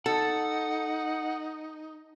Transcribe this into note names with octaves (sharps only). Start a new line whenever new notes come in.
D#4 A4 F#5